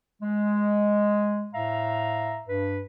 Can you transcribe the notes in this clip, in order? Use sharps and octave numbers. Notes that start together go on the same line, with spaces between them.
G#3
A2 E5 F5 A#5
G2 B4